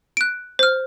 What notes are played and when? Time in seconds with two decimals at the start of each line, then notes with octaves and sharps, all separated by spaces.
0.17 F#6 D7
0.59 C5 F6